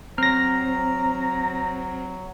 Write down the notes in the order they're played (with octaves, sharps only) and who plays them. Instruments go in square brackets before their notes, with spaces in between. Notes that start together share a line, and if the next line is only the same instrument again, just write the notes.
[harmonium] F#3 [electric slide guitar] C4 [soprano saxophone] A#5 [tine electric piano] F6 A#6